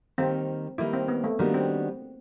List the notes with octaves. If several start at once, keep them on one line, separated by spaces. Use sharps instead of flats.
D#3 G3 A#3 C4
D#3 G3 A#3 E4
C4
B3
A3
D#3 G3 A#3 B3 D4 F#4
C4